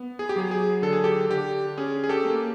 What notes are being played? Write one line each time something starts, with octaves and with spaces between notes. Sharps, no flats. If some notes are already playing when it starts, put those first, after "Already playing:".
Already playing: B3
G#4
G4
F#3 G#4
G#4
D3 A4
G#4
G4 A4
D3 G4
C#4 G#4
G#4
G4 A4
A#3